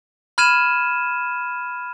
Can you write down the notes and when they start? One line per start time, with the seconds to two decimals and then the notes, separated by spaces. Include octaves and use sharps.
0.38 B5 F6 G#6 D#7 E7